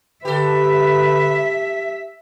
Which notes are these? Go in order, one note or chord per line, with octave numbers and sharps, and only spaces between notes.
D3 G4 A4 B4 E5